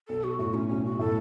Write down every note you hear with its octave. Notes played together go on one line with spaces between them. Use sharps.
B1 A4
F#4
A2 F#4
C#4
B1 C#4
F#4
A2 A4